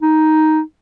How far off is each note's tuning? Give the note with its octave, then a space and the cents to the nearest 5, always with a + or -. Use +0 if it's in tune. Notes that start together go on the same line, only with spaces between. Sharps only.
D#4 +5